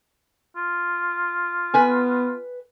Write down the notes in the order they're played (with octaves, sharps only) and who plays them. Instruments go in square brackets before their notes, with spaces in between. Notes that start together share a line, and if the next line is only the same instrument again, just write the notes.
[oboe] F4
[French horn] B3 [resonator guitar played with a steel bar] B4 G#5